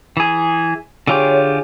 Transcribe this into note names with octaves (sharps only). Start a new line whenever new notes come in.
E3 G#4
D3 F4 G4 G#4 C#5